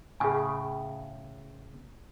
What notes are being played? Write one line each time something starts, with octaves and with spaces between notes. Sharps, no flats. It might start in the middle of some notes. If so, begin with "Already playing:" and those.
A2 C#3 G#4 G#5